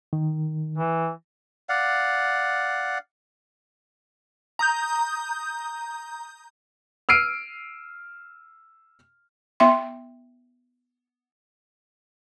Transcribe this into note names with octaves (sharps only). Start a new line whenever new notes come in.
D#3
E3
D5 F5 F#5
A#5 D#6 G6
E6 F6 C7 D7 D#7
B3 E5 C6